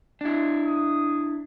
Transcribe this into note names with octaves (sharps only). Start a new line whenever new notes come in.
D4 E4
D#6